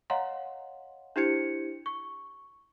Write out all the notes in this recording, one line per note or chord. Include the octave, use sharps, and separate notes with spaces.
C#5 D#5 F5 F#5 A#5 C6
D4 E4 G4 C5 G#6 C#7
C#6